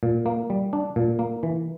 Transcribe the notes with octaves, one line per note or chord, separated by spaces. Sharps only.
A#2
A#3
G3
D4
A#2
A#3
E3